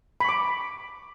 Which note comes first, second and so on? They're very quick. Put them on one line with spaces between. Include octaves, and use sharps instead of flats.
B5 C#6 D6